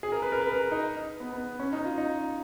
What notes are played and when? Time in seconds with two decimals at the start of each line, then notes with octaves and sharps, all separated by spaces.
0.03 G#4
0.12 A#4
0.22 B4
0.32 A#4
0.41 B4
0.52 A#4
0.72 D#4
1.20 B3
1.33 B3
1.59 C#4
1.72 D#4
1.85 F4
1.98 D#4